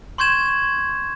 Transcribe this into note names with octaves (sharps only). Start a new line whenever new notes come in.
C6 C#6 G6 G#6 E7